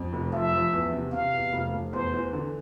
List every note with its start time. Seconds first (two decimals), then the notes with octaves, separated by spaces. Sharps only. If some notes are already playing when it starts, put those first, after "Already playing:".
Already playing: F2
0.13 F1
0.33 F3 E5
0.53 F3
0.73 E2
0.93 C3
1.12 C3 F5
1.33 E2
1.53 F1
1.73 F1
1.93 E2 C5
2.14 E3
2.33 D3